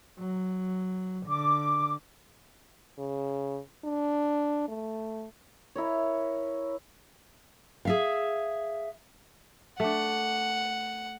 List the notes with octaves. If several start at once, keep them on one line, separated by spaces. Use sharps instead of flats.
F#3
D3 D6
C#3
D4
A3
E4 A#4 C#5
G#4 E5 F5
A3 D4 F#5